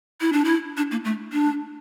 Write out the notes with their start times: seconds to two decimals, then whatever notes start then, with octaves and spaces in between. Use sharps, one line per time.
0.21 E4
0.33 D4
0.45 E4
0.77 D4
0.91 A#3
1.05 A3
1.32 D4